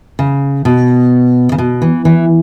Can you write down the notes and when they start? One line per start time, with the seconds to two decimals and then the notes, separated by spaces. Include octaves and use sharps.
0.19 C#3
0.65 B2
1.52 C#3
1.58 B2
1.82 E3
2.05 E3